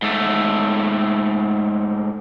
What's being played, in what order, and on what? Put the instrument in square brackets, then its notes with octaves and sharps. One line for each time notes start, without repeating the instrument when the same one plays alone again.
[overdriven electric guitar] G#2 A3